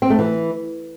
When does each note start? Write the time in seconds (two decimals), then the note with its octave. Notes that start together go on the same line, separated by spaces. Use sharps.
0.02 C4
0.10 A3
0.19 E3